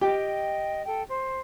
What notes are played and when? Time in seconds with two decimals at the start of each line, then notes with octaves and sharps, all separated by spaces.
0.01 G4 D#5 G5
0.85 A4 G5
1.08 C5